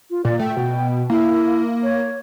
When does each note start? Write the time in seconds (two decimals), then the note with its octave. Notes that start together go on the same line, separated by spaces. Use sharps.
0.10 F4
0.25 A#2 D5
0.39 A3 G5
0.57 B2
1.10 A#3 E4
1.83 C#5